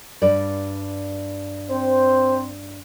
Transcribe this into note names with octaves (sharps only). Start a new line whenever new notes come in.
G2 B4 D5
C4 C5